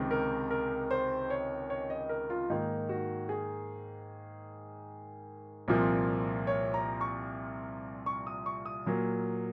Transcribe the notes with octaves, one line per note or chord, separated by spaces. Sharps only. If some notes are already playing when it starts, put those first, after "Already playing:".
Already playing: C#2 C3 D#3 G#3 C4
A#4
A#4
C5
C#5
C#5
D#5
A#4
F4
G#2 D#3 A#3 D#4
F#4
G#4
C2 A#2 F3 A#3
C#5
A#5
C#6
C#6
D#6
C#6
D#6
A#2 F#3 A#3